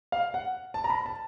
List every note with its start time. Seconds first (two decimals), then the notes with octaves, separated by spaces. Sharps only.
0.12 F5
0.34 F#5
0.74 A5
0.84 A#5
0.90 B5
1.06 A5